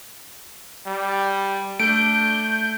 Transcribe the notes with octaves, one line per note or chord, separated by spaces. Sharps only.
G3
A3 D4 G6 D7